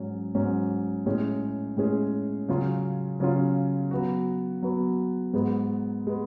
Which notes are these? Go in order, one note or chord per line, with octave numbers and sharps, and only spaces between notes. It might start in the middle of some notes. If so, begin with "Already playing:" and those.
Already playing: G#2 F#3 C#4
G#2 F#3 C#4
A2 G#3 C#4 G#4
A2 G#3 C#4 G#4
C#3 F#3 C#4 F4
C#3 F#3 C#4 F4
F#3 B3 F#4
F#3 B3 F#4
G#2 G#3 B3
G#3 B3